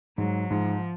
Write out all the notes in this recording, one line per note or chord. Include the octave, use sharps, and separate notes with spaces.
G#2 F#3
G#2 F3